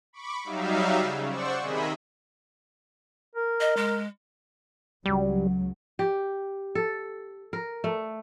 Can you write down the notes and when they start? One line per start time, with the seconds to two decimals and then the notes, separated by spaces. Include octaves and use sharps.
0.13 B5 C#6 D6
0.44 F#3 G3 D#4 E5 F5
0.97 C#3
1.29 C5 D5 F#5 C#6 E6
1.60 C3 D#3 G#4 D#5 E5 B5
3.35 A#4
3.61 D#5
3.77 G#3
5.06 C#2 F#3 G3
5.99 G4
6.75 A4
7.53 A#4
7.84 A3